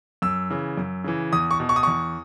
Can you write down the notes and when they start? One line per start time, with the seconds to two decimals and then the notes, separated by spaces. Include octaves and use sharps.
0.22 F#2 E6
0.50 C#3 E3
0.77 F#2
1.04 C#3 E3
1.33 E2 D#6
1.51 C#6
1.60 B2
1.69 C#6
1.76 D#6
1.83 E2 C#6